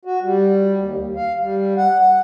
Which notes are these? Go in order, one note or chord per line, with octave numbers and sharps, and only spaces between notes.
F#4
G3
D#2
D#2
F5
G3
F#5
F#5